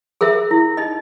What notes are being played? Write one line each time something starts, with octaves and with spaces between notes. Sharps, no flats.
G#4 A#4 C5 E5
E4
D#4 D#5